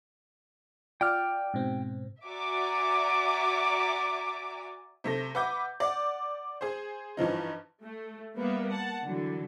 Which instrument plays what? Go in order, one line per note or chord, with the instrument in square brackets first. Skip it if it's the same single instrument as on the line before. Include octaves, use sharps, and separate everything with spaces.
[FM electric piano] F4 D5 [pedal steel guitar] G5 F6
[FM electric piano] G#2 B2 C4
[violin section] F#4 D5 E5 G#5 A#5 D6
[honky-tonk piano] C3 A3 A#6
B4 E5 F#5 D6 G6
D5 F#5
G#4 C5
G2 E3 F3 D#4
[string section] A3
G3 A#3 B3 B4 E5
F#5 A5
D3 E3 F#3